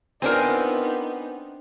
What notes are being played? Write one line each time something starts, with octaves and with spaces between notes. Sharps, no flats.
B3 C4 D4 D#4 F4 A#4 C5 G#5